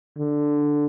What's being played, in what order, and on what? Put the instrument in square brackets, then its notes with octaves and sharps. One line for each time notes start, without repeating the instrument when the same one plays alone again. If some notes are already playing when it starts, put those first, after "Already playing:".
[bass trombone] D3